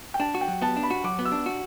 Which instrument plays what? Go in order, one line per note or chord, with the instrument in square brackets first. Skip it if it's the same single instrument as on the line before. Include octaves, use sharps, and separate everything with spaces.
[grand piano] G5
[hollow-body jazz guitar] D4 [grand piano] A5
[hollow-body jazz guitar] F#4
[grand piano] G5
[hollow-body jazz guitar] F#3
[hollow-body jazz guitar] B3 [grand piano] A5
[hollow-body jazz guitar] D4
[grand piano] B5
[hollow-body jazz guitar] F#4
[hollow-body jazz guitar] F#3 [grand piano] D6
[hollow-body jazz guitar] B3
[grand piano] E6
[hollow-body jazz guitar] D4
F#4